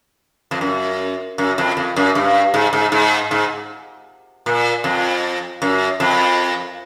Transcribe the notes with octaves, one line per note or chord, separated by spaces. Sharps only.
F2
F#2
F#2
F2
F2
F#2
G2
G#2
G#2
G#2
G#2
A#2
F2
F#2
F2